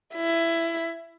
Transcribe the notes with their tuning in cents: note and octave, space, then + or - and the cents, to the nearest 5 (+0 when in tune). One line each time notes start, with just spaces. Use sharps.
E4 +15